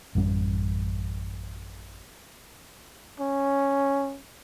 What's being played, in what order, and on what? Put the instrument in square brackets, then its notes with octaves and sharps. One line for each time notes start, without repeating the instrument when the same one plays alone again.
[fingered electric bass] A1 F#2 G3 C#4
[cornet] C#4